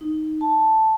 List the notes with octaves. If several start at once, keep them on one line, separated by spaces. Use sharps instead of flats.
D#4
A5